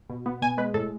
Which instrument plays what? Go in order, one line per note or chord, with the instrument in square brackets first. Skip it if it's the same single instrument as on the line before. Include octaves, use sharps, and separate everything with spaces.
[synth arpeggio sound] B2
B3
B2 G#5
G#3 B4
A2 A4